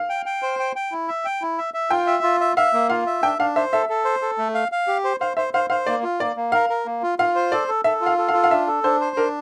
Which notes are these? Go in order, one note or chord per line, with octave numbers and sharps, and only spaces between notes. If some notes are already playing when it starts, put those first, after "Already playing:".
Already playing: F5
G5
G5
C5
G5
G5
E4
E5
G5
E4
E5
E5
F4 G5
E5
F4
E5
E5 F5
A#3
F4 F5
E5
D4 G5
D4 F5
C5 E5
A4 E5
A4
C5
A4
A3
F5
F5
G4
C5
C5 F5
C5 E5
C5 F5
C5 F5
A#3 D5
F4
A#3 D5
A#3
A#4 F5
A#4
A#3
F4
F4 F5
C5
A4 D5
A4
A4 E5
F4
F5
A4
F5
F4
F5
D4 E5
A4
D4 C5
C5
D4 A#4